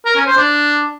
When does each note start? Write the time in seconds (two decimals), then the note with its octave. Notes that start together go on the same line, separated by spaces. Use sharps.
0.05 A#4
0.16 C#4
0.26 C5
0.37 D4